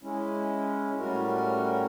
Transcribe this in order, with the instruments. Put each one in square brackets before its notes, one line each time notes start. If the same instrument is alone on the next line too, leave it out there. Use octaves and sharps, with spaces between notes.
[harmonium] G#3 C#4 E4
A2 G3 C#4 F#4 A#4